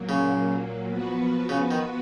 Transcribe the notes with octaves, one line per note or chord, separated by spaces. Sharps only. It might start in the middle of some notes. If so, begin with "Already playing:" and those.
Already playing: A#2 F#3 A#3
C#3
F3 B3 F#4 B4
C#3
D#3